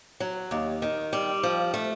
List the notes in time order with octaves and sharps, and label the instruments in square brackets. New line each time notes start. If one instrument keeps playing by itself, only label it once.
[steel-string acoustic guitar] F#3
D#2
D#3
G3
F3
A3